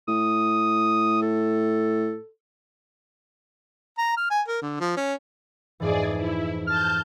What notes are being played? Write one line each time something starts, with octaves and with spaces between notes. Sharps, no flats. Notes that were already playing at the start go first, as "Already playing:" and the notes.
A2 D#6
A4
A#5
F6
G#5
A#4
D3
F3
C#4
F2 G#2 E3 G#4 D5
E4
A5 F6 G6